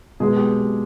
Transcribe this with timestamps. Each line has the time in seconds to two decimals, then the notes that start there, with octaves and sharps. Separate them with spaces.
0.20 B2 G#3 G#4
0.36 G4